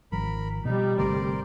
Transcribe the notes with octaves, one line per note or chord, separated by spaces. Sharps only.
G#1 F3 A#4 B5
B2 F3 G3 D#4
G1 C3 A3 A#4 C5 D5